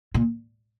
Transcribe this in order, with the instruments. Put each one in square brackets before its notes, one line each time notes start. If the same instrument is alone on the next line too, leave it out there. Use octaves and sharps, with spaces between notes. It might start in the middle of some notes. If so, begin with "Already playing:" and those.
[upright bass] A#2